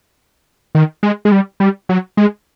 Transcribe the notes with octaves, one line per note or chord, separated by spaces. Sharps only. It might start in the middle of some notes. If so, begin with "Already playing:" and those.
D#3
G#3
G#3
G3
G3
F#3
G#3